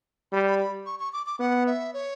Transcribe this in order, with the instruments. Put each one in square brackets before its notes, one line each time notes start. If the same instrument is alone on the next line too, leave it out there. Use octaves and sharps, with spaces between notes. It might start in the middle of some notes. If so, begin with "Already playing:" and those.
[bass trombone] G3 [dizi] B5
[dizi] B5
B5
C#6
C#6
D6
D6
[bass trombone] B3 [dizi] F#5
[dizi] E5
C#5